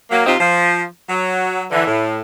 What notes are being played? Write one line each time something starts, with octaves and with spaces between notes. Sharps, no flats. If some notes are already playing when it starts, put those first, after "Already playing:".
F#3 A#3
C3 C4 D#4 F4
F3
F#3
D3 E3
A2